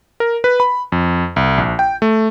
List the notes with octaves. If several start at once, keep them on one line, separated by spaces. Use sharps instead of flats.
A#4
B4
B5
F2
C2
A#1
G5
A3